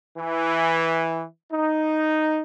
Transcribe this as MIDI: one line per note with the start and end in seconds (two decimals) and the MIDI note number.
0.17 1.24 52
1.52 2.41 63